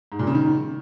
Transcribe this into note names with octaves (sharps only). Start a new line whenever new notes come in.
G#2
A#2
C#3
D#3